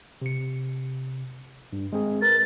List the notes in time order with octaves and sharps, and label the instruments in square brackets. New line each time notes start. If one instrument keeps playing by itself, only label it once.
[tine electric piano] C3 C#7
G2
G#3 C4 G#4
[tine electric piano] A#4 B4 [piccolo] A6